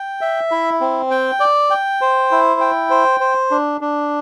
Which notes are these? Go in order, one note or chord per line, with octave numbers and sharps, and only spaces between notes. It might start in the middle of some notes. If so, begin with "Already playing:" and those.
Already playing: G5
E5
E4
C4
G5
D5
G5
C5
E4
G5
C5
C5
D4
D4